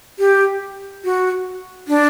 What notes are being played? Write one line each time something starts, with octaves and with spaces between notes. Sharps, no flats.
G4
F#4
D4